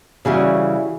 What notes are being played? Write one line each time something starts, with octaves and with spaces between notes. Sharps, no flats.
C#3 E3 G3 F#4 G#4